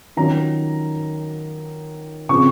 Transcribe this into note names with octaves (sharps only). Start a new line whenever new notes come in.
D#3 F#3 C#4 F4 A#5
C#3 F3 C4 C#6